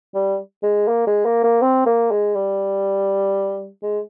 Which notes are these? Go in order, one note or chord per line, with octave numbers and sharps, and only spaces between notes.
G3
G#3
A#3
G#3
A#3
A#3
C4
A#3
G#3
G3
G#3